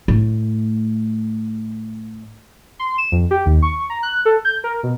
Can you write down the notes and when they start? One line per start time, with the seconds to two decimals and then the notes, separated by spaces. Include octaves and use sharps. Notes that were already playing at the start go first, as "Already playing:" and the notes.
0.08 A2 A3
2.79 C6
2.98 E7
3.12 F2
3.31 G4
3.46 D#2
3.62 C#6
3.90 A#5
4.03 F#6
4.25 A4
4.45 G6
4.64 A#4
4.83 B2